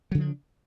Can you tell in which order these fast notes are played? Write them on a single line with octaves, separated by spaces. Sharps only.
F#3 C#3 F3 D4